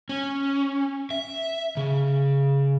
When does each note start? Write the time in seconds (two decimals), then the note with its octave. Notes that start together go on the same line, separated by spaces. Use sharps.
0.09 C#4
1.11 E5
1.77 C#3